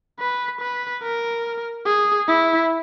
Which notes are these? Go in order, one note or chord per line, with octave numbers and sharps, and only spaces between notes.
B4
B4
A#4
G#4
E4